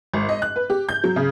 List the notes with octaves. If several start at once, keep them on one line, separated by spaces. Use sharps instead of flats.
G#1
D#5
F#6
B4
G4
G6
F#3
C#3